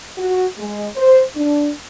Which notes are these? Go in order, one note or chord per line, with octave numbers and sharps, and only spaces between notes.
F#4
G#3
C5
D4